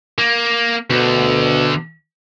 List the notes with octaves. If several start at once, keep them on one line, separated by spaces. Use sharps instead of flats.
A#3
D2 B2 D3